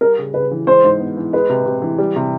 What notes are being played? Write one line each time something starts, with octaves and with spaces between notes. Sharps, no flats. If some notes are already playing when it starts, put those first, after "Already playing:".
G3 A#4
C#3
C#3 B4
E3
G#3 C5
G#2
B3
E3
G#3 B4
C3
C3
E3
G3
C3